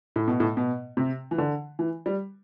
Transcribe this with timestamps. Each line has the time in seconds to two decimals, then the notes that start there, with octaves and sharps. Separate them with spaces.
0.16 A2
0.28 B2
0.40 A2
0.57 B2
0.97 C3
1.31 E3
1.38 D3
1.79 E3
2.06 G3